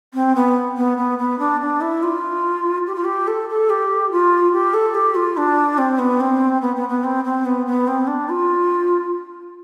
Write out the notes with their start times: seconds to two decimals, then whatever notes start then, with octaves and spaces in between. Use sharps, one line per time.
0.14 C4
0.36 B3
0.77 B3
0.98 B3
1.19 B3
1.39 D4
1.61 D4
1.81 E4
2.03 F4
2.86 G4
2.95 F4
3.04 G4
3.27 A4
3.49 A4
3.70 G4
4.11 F4
4.53 G4
4.74 A4
4.95 G4
5.15 F4
5.37 D4
5.78 C4
5.99 B3
6.20 C4
6.62 B3
6.76 B3
6.89 B3
7.04 C4
7.24 C4
7.45 B3
7.66 B3
7.88 C4
8.07 D4
8.29 F4